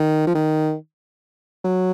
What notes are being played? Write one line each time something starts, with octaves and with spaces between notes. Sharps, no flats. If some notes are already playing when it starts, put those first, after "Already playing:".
Already playing: D#3
F3
D#3
F#3